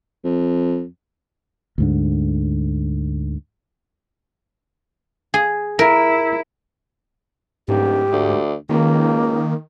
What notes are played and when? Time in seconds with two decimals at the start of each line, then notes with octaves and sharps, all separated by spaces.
0.24 F2
1.78 D2 G#2 D3
5.34 G#4
5.79 E4 A#4
7.68 D1 G#2 G4
8.12 D2
8.69 C#2 D#3 A#3